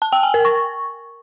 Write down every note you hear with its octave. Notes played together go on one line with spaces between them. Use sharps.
A5
G5
G#5
A#4
C#6